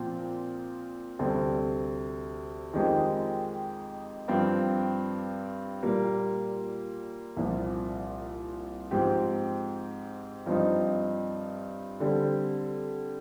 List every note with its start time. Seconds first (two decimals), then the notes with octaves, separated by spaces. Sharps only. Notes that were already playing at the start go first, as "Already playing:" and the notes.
Already playing: A#2 F3 C4
1.19 D2 C3 G3 C4
2.73 F2 D#3 G#3 C4 G4
4.28 G2 F3 C4 G4
5.83 A#2 G3 A#3
7.37 C2 A#2 F3
8.91 G#2 F3 C4 G4
10.46 G2 F3 C4 D#4
12.00 D3 G3 C4